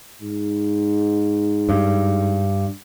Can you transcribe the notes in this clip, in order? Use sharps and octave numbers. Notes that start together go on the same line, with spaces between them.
G#2
G2